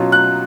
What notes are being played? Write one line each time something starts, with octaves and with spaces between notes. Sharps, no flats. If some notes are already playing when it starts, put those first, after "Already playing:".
Already playing: B2 F#3 C#4 F4
F#6